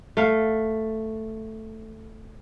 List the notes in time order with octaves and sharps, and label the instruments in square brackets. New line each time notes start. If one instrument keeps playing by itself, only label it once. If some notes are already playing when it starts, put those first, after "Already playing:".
[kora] A3 F5